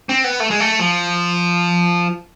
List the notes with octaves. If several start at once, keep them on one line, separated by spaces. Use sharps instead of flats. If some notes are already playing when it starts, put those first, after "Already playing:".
C4
B3
A3
G#3
A3
F3